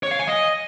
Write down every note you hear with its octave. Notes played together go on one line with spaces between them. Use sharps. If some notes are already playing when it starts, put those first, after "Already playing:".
C#5
F5
G#5
D#5